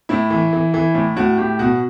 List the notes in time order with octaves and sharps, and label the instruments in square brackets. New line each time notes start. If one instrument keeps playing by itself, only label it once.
[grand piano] A2 E4
E3
E3
E3
A2
A2 F#4
A2 G4
B2 F#4